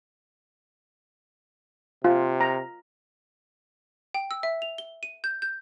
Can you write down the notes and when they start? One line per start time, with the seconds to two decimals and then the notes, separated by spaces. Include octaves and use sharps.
2.05 C3 F4
2.40 A#5
4.14 G5
4.31 E6
4.43 E5
4.62 F7
4.78 G7
5.03 D#7
5.24 G6
5.42 G6